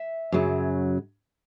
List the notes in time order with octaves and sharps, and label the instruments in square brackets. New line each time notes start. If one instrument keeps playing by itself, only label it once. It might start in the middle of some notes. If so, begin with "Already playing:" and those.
Already playing: [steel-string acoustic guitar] E5
F#2 C#3 F#3